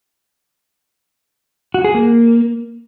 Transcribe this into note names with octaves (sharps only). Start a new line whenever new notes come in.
F#4
G#4
A#3